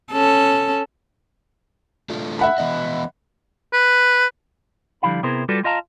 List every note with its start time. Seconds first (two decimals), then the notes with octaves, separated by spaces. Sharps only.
0.13 C#4 A4
2.10 A3 D4 F4
2.39 E5 F#5 B5
2.58 E3 B3 D#5
3.73 B4
5.02 D3 F3 G3 E4 F5 B5
5.23 C3 B3 E4 G#4 A#4 C5
5.49 G3 F4 F#4 A4 B4 D5
5.64 F4 D#5 F5 A5 A#5